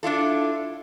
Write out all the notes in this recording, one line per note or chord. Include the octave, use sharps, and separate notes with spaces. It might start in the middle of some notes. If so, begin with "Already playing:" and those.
D4 E4 F4 A4